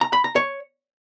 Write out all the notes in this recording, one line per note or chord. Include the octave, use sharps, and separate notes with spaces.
A#5
B5
A#5
C#5